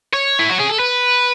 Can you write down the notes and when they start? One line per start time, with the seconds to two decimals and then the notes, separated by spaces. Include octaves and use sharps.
0.13 C#5
0.39 E4
0.49 F#4
0.59 G#4
0.69 A4
0.79 B4